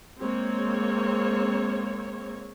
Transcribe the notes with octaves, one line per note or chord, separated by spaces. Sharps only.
G#3 A#3 C4 C#5